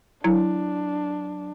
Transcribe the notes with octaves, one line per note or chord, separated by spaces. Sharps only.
F#3 D4 E4